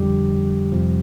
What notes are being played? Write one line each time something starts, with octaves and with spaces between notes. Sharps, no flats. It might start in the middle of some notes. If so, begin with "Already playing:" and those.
Already playing: F2 D3 F3 G3 G4
F2 C3 F3